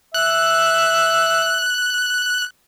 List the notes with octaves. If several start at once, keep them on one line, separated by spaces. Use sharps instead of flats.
E5 F#6